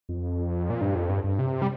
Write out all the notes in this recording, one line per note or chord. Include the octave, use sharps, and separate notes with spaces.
F2
A#2
G2
F2
G2
G2
C3
G3